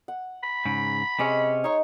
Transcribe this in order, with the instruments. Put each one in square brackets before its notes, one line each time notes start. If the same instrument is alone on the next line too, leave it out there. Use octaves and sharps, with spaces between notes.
[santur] F#5
[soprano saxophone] B5
[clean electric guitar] G#2 C#3
[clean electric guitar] C3 C#4 [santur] G#3
[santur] D#4 C#6 [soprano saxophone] C#5